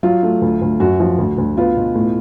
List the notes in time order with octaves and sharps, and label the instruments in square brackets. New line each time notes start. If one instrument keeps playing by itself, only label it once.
[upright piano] F#3 F4
A3
D2
D2
F#2 F#4
F3
D2
D2
B3 F4
B2
A2